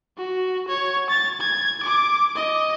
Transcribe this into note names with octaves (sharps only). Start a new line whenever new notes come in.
F#4
C#5
A6
G#6
D6
D#5